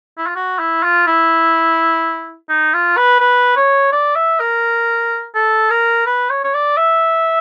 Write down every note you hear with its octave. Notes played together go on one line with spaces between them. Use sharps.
E4
F4
F#4
E4
F4
E4
D#4
F4
B4
B4
C#5
D5
E5
A#4
A4
A#4
B4
C#5
C#5
D5
E5